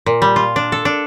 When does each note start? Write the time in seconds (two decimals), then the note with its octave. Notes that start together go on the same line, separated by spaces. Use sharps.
0.06 A#2
0.22 G3
0.36 F4
0.56 D4
0.72 A4
0.85 D4